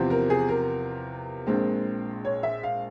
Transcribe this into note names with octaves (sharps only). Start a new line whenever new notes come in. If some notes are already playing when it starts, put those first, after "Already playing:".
Already playing: E2 C3 F3 C4
A#4
G#4
A#4
A#1 A#2 G#3 C4
C#5
E5
F5